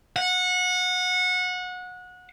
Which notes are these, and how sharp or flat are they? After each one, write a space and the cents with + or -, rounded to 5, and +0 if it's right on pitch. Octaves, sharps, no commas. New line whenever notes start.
F#5 -25